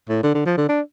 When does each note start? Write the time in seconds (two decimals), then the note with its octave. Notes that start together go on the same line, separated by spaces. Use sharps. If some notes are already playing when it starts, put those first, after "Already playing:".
0.09 A2
0.23 D3
0.34 D3
0.46 F3
0.57 D3
0.69 D4